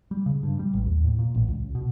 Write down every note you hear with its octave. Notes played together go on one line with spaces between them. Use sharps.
G3
C#3
G2
G3
A1
D#2
A2
A#2
A1
C#2
B2